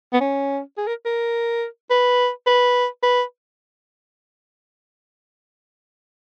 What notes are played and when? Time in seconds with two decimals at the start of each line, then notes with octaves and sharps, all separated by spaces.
0.13 B3
0.21 C#4
0.78 G#4
0.87 A#4
1.05 A#4
1.90 B4
2.47 B4
3.03 B4